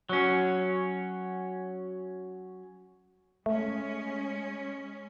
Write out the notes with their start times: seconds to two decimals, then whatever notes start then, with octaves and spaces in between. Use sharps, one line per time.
0.09 F#3 C#4
3.46 G#3 A3 C#4